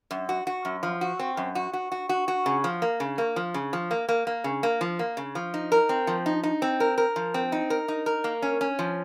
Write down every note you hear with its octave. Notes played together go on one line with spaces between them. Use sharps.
F#2
F#4
F#4
F#2
F3
F#4
C4
F#2
F#4
F#4
F#4
F#4
F#4
C#3
F3
A#3
C#3
A#3
F3
C#3
F3
A#3
A#3
A#3
C#3
A#3
F3
A#3
C#3
F3
D#4
A#4
C4
F3
D#4
D#4
C4
A#4
A#4
F3
C4
D#4
A#4
D#4
A#4
A#3
C#4
C#4
F3